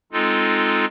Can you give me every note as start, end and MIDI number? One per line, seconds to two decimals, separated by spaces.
0.12 0.85 56
0.12 0.85 60
0.12 0.85 63
0.12 0.85 65
0.12 0.85 69